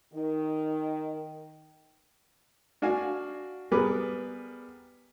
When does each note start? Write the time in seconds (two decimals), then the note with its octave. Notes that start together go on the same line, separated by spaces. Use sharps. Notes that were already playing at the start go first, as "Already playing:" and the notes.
0.14 D#3
2.82 D4 F#4 F5 G#5
3.71 G3 B3 G#4 A#4 B4 D6